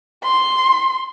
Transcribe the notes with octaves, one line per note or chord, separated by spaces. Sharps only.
C6